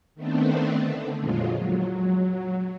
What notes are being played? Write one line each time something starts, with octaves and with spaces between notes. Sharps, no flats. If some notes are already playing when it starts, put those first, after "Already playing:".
D#3 A3 B3 C4 D4
D3
F2 A#2 F#3 G#3 F4
F#3